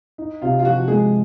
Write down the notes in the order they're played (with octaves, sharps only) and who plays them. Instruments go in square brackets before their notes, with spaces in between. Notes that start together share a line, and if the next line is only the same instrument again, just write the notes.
[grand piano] D#4
[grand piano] C3 [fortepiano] F4
[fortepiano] F4
[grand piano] F3 [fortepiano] F#4
[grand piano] G#3 [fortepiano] G#4